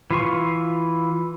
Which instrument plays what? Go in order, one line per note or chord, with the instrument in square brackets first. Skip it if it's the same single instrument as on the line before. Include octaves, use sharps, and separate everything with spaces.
[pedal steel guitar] E3 F4 C#6